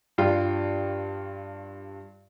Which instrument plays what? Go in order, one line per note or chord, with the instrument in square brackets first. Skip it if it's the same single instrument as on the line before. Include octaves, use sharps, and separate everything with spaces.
[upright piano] G2 F4 G5